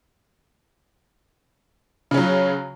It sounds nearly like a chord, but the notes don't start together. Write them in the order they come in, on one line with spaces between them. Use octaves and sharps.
C#3 C#4 F#3